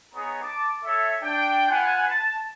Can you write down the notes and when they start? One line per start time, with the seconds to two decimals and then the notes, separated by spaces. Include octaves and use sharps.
0.14 B3 D#4 G#4 C#5 A#5
0.42 A5 D6
0.84 A4 C#5 E5
1.22 D4 G5
1.70 F4 B4 F#5 G#5
2.08 A5